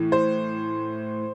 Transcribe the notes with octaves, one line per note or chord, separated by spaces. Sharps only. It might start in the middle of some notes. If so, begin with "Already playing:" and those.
Already playing: A2 E3
C5